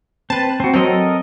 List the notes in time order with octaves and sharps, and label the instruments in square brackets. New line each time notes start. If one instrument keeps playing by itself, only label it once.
[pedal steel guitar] C4 B4 [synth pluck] A5
[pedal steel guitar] C4 F#4
[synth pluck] F#3 C4 [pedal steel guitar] A4 A#4 D#5